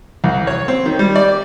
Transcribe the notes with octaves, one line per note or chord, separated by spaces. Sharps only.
C2
C#5
C4
D#3
G3
D5